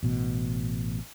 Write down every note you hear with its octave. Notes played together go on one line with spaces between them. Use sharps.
A1 B2